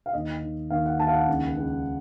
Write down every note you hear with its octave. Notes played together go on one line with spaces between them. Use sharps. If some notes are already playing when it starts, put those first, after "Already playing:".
F5
D#2 D#5
D#3
D#2 F5
F#5
D#2 A5
F5
F#5
C#2
C#2